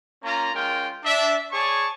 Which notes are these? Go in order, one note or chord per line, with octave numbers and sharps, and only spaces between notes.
A#3 C#4 F4 A#5
G#3 C#4 F4 A#4 G5
D4 E5
G#4 C#5 D5 A5 C#6